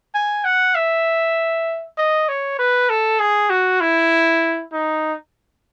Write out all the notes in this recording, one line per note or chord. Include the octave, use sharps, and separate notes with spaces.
G#5
F#5
E5
D#5
C#5
B4
A4
G#4
F#4
E4
D#4